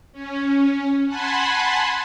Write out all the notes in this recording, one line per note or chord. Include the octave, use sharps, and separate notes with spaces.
C#4
F#5 G#5 A5 B5 C6